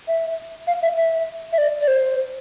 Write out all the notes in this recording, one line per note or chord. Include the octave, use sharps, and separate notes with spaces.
E5
F5
E5
E5
E5
D5
D5
C5